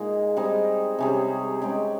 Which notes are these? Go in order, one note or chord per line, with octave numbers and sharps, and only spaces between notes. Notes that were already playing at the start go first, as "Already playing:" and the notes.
Already playing: A#2 G#3 D#4
G3 C4 D#4 G#4
C3 G3 C#4 G#4
G#3 C#4 G4